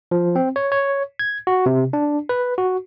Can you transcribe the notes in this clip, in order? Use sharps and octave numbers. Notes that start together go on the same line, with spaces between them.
F3
C4
C#5
C#5
G#6
F#4
C3
D4
B4
F#4